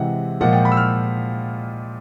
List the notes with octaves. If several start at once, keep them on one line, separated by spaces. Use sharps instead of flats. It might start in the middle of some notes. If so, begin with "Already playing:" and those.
Already playing: C3 E3 G#3 F#5
A#2 F3 G#3 F#5
G5
B5
E6
F6